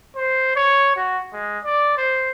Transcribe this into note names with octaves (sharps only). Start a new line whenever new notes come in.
C5
C#5
F#4
G#3
D5
C5